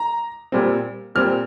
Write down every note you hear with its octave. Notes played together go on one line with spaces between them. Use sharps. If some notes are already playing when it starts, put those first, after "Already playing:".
Already playing: A#5
A#2 G3 C4
A#2 G3 C4 F6